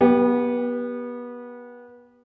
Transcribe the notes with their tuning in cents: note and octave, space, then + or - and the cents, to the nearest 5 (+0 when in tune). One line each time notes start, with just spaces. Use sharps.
B3 -25 G4 +0